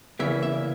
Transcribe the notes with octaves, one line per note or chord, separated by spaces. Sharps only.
E2 C#3 E3 A#3 E5
E5